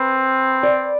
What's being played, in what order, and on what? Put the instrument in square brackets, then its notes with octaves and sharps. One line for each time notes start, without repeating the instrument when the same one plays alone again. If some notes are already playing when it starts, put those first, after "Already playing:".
Already playing: [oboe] C4 [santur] B4
[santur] D5